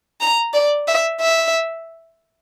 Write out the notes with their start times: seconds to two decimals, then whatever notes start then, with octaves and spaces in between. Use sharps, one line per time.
0.21 A#5
0.54 D5
0.88 E5
1.21 E5